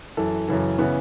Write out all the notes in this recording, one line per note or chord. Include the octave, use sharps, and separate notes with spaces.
F#2 E3 A4
F#2 C#3 E3
C#3 E3 B3